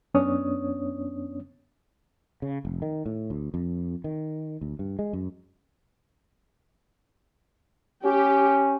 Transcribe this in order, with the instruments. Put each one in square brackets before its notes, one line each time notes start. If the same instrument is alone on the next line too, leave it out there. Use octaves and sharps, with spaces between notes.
[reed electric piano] F#2 B3 C#4 D4 C#5 D#6
[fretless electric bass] C#3
F1
D#3
A2
D2
F2
D#3
D2
G2
G#3
F#2
[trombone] C#4 [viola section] G4